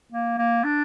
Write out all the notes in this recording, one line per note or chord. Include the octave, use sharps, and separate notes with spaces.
A#3
A#3
D4